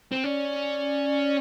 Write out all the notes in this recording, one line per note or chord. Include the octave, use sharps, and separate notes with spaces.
C4
C#4 D5